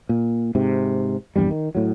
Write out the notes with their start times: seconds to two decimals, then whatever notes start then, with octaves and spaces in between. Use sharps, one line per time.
0.09 A#2
0.55 G#2 C3
1.36 A#1 E2 G2 G3
1.51 D#3
1.75 A2 F#3